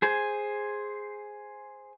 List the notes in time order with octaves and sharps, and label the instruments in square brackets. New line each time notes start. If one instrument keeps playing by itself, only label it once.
[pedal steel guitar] G#4 C5 G#5